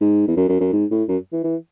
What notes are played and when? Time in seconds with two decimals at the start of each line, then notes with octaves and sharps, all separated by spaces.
0.01 G#2
0.28 E2
0.37 F#2
0.49 F#2
0.60 F#2
0.73 G#2
0.91 A2
1.08 F#2
1.32 E3
1.43 E3